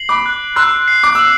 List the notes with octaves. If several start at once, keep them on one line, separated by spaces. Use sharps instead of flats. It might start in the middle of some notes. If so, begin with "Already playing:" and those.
Already playing: C7 F#7
B5 D6
F#6
C6 E6 F#6
C7
D6
E6 F#7